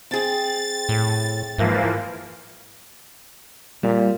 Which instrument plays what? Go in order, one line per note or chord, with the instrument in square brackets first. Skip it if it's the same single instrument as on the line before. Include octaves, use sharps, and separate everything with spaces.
[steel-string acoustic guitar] C4 G#4 [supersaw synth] A6
[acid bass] A2
[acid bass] G#2 [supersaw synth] E3 F3 A#3
[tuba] A#2 [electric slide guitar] G3